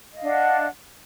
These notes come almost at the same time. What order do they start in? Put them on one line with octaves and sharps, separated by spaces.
D#5 F5 D4 F#5